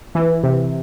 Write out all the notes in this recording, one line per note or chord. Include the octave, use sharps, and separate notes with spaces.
E3
C3